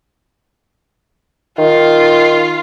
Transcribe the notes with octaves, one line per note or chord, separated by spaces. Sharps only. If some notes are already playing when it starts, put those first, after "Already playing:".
D#3 F4